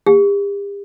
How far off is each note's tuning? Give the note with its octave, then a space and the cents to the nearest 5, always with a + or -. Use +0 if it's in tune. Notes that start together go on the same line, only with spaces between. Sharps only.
G4 +45